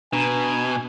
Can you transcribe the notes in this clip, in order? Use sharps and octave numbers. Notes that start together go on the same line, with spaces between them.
B2 D4 G#5 A#5